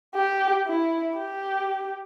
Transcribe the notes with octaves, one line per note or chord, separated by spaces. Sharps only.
G4
E4
G4